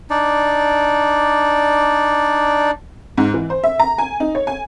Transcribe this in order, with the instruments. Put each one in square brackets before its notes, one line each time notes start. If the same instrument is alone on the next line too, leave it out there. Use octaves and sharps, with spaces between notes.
[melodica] D4 D#4 D5
[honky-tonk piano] G#2
E3
C5
E5
A#5
G#5
D#4
C#5
G#5